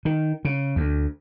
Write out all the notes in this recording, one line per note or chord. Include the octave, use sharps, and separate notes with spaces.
D#3
C#3
D2